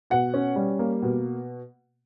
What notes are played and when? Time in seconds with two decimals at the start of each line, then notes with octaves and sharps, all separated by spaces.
0.10 B2 F#5
0.34 C#4
0.56 G3
0.79 A#3
1.02 B2